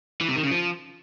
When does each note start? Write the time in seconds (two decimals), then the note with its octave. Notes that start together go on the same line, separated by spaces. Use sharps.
0.21 E3
0.28 C3
0.36 D#3
0.43 C#3
0.51 F3